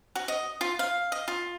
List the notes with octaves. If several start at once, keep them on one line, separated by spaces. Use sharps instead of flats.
F#4
D#5
F4
F5
D#5
F4